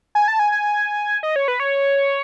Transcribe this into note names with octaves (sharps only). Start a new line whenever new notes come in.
G#5
A5
G#5
G#5
D#5
C#5
B4
C#5